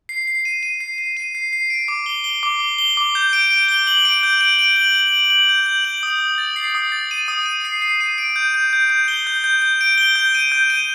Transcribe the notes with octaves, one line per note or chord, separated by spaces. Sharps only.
C7
C7
D#7
D#7
C7
C7
D#7
C7
C7
D7
D6
G7
G7
D6
G7
G7
D6
G6
D7
D7
G7
F#7
D7
G6
D7
D7
F#7
F#7
F#7
F#7
G6
G6
F#7
D#6
D#6
A6
C7
D#6
A6
D#7
D#6
D#7
C7
C7
D#7
D7
G6
G6
G6
G6
G7
G6
G6
G6
D7
G7
G6
D#7
G6
D#7